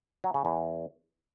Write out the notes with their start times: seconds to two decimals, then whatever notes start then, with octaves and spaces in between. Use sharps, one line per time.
0.24 F#3
0.34 C#3
0.45 E2